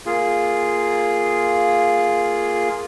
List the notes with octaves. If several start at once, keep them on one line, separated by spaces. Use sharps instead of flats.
A#3 F4 G#4